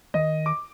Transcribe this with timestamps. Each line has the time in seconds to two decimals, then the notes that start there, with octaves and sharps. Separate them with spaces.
0.14 D#3 D#5
0.46 D6